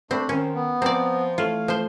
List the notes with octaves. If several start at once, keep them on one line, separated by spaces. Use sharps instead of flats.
A3 C4 D4 B5
D#3 C#4 C5
B3
F3 C4 D5 G5 A#5
E3 A3 F4 C#5 F5
F3 C5